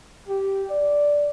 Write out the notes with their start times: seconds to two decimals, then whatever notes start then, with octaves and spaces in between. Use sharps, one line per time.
0.29 G4
0.71 D5